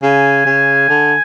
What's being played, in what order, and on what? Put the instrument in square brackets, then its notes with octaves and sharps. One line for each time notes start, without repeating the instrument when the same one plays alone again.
[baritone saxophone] C#3 [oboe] G#5
[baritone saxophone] C#3
D3